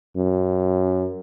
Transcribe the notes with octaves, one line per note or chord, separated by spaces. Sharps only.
F#2